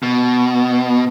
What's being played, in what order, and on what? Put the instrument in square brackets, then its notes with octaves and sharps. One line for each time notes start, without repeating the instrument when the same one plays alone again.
[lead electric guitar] B2